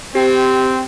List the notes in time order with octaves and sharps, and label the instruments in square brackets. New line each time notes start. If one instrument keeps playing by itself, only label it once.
[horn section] C4 [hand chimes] G4